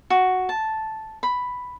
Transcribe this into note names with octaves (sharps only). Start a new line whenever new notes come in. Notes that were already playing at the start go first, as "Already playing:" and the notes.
F#4
A5
B5